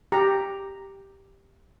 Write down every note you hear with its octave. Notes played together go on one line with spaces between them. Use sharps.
G4 A#5